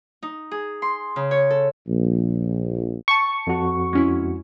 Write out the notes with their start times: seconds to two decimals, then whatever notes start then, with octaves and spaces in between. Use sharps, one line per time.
0.22 D#4
0.51 G#4
0.82 C6
1.16 C#3
1.31 C#5
1.50 A4
1.87 A#1
3.08 G5 A5 C#6
3.47 F2 F#4
3.93 G#3 C#4 E4